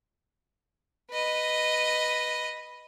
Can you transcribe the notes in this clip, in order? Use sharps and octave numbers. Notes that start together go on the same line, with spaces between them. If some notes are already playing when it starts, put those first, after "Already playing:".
B4 D#5